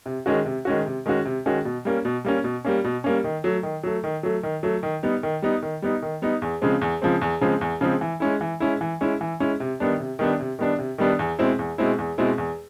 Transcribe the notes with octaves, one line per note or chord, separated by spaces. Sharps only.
C3
D#3 G#3 C#4 F#4
C3
D#3 G#3 C#4 F#4
C3
D#3 G#3 C#4 F#4
C3
D#3 G#3 C#4 F#4
B2
G3 A#3 C#4
B2
G3 A#3 C#4
B2
G3 A#3 C#4
B2
G3 A#3 C#4
D#3
F#3 A3
D#3
F#3 A3
D#3
F#3 A3
D#3
F#3 A3
D#3
G3 B3 D#4
D#3
G3 B3 D#4
D#3
G3 B3 D#4
D#3
G3 B3 D#4
E2
C#3 F3 G#3 C4
E2
C#3 F3 G#3 C4
E2
C#3 F3 G#3 C4
E2
C#3 F3 G#3 C4
E3
G#3 C#4 E4
E3
G#3 C#4 E4
E3
G#3 C#4 E4
E3
G#3 C#4 E4
C3
D#3 G3 B3 D4
C3
D#3 G3 B3 D4
C3
D#3 G3 B3 D4
C3
D#3 G3 B3 D4
E2
B2 G#3 C4 E4
E2
B2 G#3 C4 E4
E2
B2 G#3 C4 E4
E2